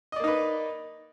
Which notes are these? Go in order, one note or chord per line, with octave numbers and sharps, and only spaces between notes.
A#3 D#4 B4 D5 D#5